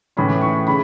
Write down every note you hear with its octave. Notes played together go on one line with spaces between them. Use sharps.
A2 E3 A3 C#4 B5
C#6
C#3 B5